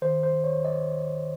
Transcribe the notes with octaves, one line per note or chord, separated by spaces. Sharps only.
D#3 C5
C5
D#2 C#5
D#5